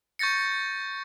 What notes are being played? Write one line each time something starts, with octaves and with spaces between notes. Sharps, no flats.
C#6 G6 A6 A#6 C#7